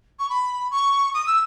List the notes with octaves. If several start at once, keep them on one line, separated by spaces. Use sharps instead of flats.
C#6
B5
C#6
D#6
E6